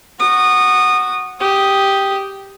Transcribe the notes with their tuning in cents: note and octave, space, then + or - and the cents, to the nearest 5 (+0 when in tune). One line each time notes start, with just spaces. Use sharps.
F#4 +0 D#6 -20
G4 +0 D#6 +0